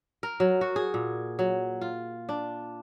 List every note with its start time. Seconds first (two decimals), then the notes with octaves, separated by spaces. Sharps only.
0.23 A#4
0.40 F#3
0.61 F#4
0.76 G#4
0.94 A#2
1.39 F#3
1.81 F4
2.29 D4